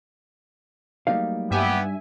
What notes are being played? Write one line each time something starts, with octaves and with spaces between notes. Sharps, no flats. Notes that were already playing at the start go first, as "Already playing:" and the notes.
F#3 G3 A3 A#3 D#4 F5
G2 B3 G4 E5 G#5